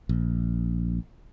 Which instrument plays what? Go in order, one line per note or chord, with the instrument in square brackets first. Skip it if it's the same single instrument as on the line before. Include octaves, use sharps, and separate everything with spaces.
[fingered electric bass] A#1